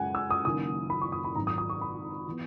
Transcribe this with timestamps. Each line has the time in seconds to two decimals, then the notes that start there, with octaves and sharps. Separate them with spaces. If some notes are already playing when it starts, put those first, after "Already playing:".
Already playing: F#2 C#3 G#3 F#5 G#5
0.15 E6
0.30 D#6
0.45 F#1 F#2 D#3 A#3 D#6
0.90 B5
1.02 C#6
1.12 D#6
1.25 B5
1.35 G#1 G#2 F#3 A#5
1.47 D#6
1.58 D#6
1.70 C#6
1.81 B5
2.28 E3 B3